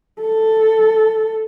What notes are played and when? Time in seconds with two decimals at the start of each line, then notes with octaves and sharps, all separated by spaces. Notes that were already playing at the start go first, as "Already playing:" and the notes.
0.22 A4